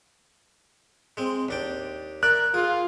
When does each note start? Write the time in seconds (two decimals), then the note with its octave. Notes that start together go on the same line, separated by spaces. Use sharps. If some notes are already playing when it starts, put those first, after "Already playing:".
1.17 G#3 C4
1.49 D#2 D4 G5
2.23 A#4 D5 E5 F#6
2.54 F4 G#4